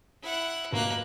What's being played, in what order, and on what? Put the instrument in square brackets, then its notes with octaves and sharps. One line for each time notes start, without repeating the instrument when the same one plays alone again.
[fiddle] E4 F#5
[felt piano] F1 B1 [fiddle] A#3 F#6